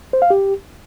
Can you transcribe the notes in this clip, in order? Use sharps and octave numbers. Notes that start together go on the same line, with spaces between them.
C5
F5
G4